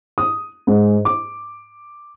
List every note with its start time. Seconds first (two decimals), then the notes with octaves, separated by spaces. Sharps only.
0.18 D#6
0.67 G#2
1.05 D6